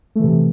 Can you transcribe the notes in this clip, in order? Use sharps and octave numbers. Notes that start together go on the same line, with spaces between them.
C3 E3 A3